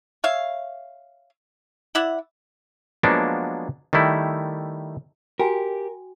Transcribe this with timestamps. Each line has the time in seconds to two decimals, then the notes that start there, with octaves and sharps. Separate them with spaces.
0.24 C#5 E5 F5
1.95 E4 D5 E5 F#5
3.03 F3 F#3 G#3 A#3 B3 D4
3.93 D#3 G3 A3 E4
5.40 F#4 G4 A#4 G5 G#5